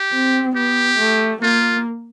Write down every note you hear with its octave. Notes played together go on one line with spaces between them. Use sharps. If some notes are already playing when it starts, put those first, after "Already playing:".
Already playing: G4
C4
B3 G4
A3
A#3 F4